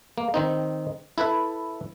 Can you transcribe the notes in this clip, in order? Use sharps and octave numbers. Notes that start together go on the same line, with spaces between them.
A#3
D#3 C4 D#4
E4 A4 B4 E5